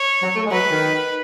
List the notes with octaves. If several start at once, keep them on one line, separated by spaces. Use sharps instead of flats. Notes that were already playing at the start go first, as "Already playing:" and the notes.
Already playing: C#5
F#3
A3
G#3
F#3 B4
D#3